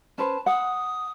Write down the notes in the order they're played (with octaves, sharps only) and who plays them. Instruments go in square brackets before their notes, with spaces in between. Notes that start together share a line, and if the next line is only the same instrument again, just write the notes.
[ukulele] C#4 B4 C5 [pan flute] A5
[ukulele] F#5 [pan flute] D#6